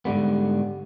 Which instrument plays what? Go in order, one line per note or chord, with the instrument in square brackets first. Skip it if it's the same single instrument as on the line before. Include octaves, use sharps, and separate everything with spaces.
[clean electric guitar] G#2 D3 G3 B3